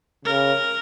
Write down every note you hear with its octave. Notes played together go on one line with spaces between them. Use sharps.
C#3 A#4